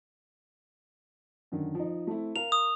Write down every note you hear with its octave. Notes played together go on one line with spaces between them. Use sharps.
F#2 D3 D#3
F3 D#4
A3 C4 E4
A#4 F5 F7
D#6